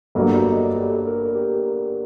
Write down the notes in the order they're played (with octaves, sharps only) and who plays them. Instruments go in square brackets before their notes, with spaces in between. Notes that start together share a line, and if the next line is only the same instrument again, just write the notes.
[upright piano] G1 G2 F#3 A#3 [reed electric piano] A4
[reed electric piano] D#5
D5
G4
A4
A#4
A#4
G4